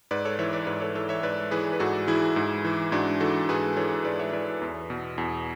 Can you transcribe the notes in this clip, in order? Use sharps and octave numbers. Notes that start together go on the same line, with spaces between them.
G#2 B4 D5
A4 C#5
E3 C#5 E5
B4 D5
G#2 B4 D5
A4 C#5
E3 A4 C#5
C#5 E5
G#2 B4 D5
E3 G#4 B4
B4
G#2 F#4 A4
E3 E4 G#4
G#2
E3
G#2 D4 F#4
E3 F#4 A4
G#2 G#4 B4
E3 A4 C#5
G#2 B4 D5
C#5 E5
E3 B4 D5
E2
B2
E2